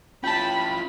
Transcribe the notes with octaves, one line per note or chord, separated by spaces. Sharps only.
C#4 E4 F4 G5 A5 B5